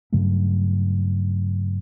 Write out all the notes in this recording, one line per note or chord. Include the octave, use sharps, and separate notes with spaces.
G2 C#3 F#3 A3